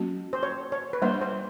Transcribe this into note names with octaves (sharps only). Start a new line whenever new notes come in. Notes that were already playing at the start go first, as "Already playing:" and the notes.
Already playing: F#3 A#3 C#4 F#4
C5
C#5
C#5
B4
G3 A#3 D4 C5
C5